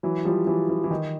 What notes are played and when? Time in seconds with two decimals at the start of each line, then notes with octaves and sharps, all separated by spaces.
0.03 E3 F#3
0.25 F3 G3
0.47 E3 F#3
0.69 E3
0.84 E3
0.91 D#3